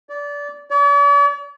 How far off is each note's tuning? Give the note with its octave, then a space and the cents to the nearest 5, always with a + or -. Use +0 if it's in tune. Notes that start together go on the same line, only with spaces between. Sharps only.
D5 -25
D5 -45